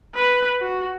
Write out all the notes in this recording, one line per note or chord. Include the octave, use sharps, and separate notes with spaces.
B4
F#4